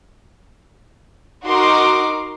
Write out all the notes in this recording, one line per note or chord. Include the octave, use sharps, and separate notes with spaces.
D#4 F#4 A#4 C6 D6